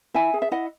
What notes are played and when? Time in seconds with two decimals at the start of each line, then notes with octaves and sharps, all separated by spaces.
0.14 E4 E5 G#5
0.34 G#4
0.42 E5
0.51 E4 D#5 F#5